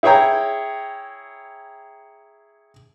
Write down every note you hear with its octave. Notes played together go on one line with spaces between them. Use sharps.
E4 G#4 C#5 G5 A#5